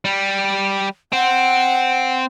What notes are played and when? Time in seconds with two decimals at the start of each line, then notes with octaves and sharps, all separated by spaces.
0.05 G3
1.13 C4 F#5